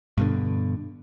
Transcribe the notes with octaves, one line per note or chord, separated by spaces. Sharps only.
G2 B2 D3